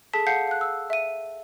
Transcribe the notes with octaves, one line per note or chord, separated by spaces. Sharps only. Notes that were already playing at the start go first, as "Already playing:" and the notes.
G#4 A4 A5 B6
F5 F#5 A5 G6 C7 C#7
F5 F#6
E6
E5 D#7